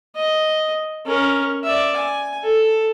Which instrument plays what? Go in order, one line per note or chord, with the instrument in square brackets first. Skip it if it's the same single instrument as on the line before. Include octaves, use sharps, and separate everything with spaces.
[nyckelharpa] D#5
C#4 A#4
D5 E5
G#5
A4